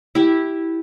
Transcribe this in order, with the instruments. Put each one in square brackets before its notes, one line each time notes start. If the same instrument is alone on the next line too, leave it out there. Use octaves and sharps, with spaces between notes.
[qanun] E4 G4